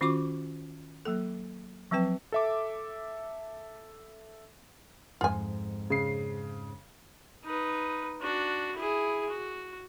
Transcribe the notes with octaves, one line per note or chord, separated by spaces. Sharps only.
D#3 C#4 F4 F#4 C#6 D6
F#3 A#3 A4
F3 F#3 C4 B4 G5
A4 E5 D6
F2 G#2 F4 G#5
C#3 C7
D#4 B4
D4 F#4
E4 G#4
F#4